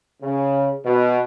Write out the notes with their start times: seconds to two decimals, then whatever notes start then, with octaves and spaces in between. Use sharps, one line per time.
0.22 C#3
0.85 B2